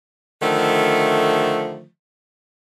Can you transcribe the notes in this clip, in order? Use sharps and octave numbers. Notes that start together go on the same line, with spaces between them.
D3 D#3 F3 A3